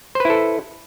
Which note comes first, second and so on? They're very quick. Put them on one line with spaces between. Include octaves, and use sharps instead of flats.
C5 B4 E4 A4